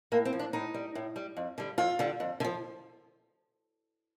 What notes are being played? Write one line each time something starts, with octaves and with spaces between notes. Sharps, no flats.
A2 A#3
C4
F3
D4
A2 D#4
G3
A2
G3
F2
D3 G3
F2 F4
D3 G3
F2
D3
F3